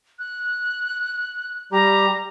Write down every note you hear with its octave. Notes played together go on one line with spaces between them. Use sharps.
F#6
G3 G4 A#5